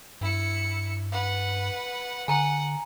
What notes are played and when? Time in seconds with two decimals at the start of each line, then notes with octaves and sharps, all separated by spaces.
0.21 G2 E4 C#7
1.12 B4 F#5
2.28 D3 F#5 G#5 A#5